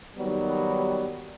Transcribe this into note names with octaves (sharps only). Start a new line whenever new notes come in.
D#2 D#3 F#3 G3 B3